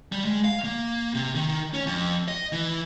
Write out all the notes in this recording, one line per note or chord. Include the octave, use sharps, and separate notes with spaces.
G3
G#3
F5
A#3
C3
D#3
C#4
F2
D#5
E3